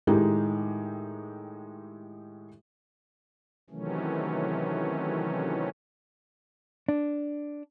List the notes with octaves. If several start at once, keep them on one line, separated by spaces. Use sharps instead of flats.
A2 D#3 G#3 D#4 G4
C3 D#3 E3 F#3 A3 C#4
D4